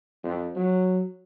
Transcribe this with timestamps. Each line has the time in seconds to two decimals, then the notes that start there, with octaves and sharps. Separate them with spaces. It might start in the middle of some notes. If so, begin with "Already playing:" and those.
0.24 F2
0.56 F#3